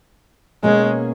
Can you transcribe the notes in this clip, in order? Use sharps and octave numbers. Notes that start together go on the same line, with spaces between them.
B2 G#3 A#3 C#4 G#4 C#5